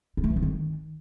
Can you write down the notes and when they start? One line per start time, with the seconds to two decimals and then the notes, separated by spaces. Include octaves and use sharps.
0.17 E4
0.24 A3
0.30 E3
0.36 D#4
0.42 D#3